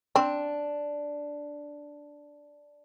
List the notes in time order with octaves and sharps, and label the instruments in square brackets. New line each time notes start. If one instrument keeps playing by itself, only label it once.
[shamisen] C4 [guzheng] D4